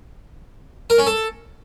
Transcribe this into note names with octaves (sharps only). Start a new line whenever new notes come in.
A#4
C#4
A4